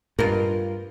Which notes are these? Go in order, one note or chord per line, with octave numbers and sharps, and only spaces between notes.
G2 F4 A#4